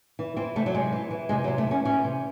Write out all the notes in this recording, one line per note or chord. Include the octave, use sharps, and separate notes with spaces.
E3
E3 C4
C3 A3
F#3
C3 G#3
E3
E3
C3 G#3
F#3
C3
A3
E3 C#4
E3 C#4
C3